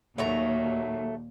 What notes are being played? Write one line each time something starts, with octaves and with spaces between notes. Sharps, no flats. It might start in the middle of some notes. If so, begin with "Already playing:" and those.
D#2 A#2 F#3 A3 A#5